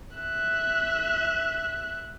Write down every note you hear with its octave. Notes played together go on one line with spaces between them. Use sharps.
E5 F#6